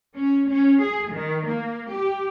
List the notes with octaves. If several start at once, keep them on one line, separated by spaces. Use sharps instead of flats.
C#4
C#4
G#4
D#3
A#3
G4